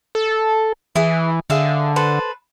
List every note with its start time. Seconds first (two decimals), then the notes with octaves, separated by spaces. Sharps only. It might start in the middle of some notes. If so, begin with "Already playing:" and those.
0.15 A4
0.96 E3 E4 G#4
1.50 D3 G#4 E5 F5
1.96 A4 B4 C5